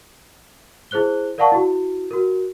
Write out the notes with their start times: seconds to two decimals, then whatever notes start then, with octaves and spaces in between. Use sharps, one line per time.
0.91 E4 G#4 C5 F#6 G7
1.38 A#4 D5 F5 F#5 A5 C#6
1.52 E4 F#4
2.11 F#4 A#4